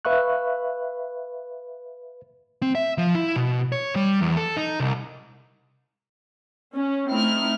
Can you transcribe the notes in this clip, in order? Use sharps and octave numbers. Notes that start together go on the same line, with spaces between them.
B4 E5 F5 C#6 F#6
C4
E5
F3
E4
B2
C#5
G3
E2
A4
D#4
C2
C#4
A3 C4 D#4 E4 F6